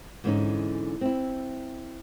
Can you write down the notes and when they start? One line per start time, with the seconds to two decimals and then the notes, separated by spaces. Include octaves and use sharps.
0.24 G#2 D3 E3 B3 C#4 D#4
1.01 C4 E4